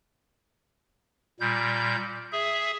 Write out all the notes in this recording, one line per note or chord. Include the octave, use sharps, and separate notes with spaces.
A#2 G3 G6
G#4 E5